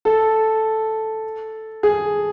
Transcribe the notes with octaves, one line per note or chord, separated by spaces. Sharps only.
A4
G#4